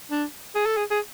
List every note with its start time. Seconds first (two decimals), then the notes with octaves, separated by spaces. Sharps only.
0.11 D4
0.55 G#4
0.66 A4
0.77 G#4
0.91 G#4